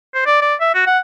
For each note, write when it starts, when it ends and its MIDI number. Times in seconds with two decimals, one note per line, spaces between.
0.14 0.23 72
0.26 0.40 74
0.42 0.54 74
0.60 0.71 76
0.75 0.84 66
0.87 0.99 78